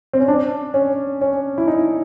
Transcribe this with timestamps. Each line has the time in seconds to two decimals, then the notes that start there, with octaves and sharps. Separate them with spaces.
0.13 C4
0.20 C#4
0.28 D4
0.74 C#4
1.21 C#4
1.58 E4
1.68 D#4